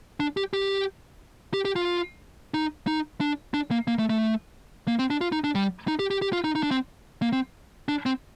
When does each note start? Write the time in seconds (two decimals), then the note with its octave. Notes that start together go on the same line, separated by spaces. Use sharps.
0.20 D4
0.37 G4
0.53 G4
1.54 G4
1.65 G4
1.76 F4
2.54 D#4
2.87 D#4
3.21 D4
3.54 D4
3.71 A#3
3.88 A#3
3.99 A3
4.10 A3
4.88 A#3
4.99 C4
5.10 D4
5.21 F4
5.32 D#4
5.44 D4
5.55 G3
5.88 D#4
5.99 G4
6.11 G4
6.22 G4
6.33 F4
6.44 D#4
6.55 D#4
6.63 D4
6.71 C4
7.22 A#3
7.33 C4
7.89 D4
8.06 C4